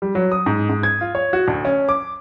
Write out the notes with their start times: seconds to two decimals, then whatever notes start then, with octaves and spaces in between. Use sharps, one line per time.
0.02 G3
0.15 F#3
0.32 D#6
0.46 G#2
0.69 G#2
0.83 G#6
1.01 F4
1.15 C#5
1.33 F#4
1.48 D2
1.65 C#4
1.89 D6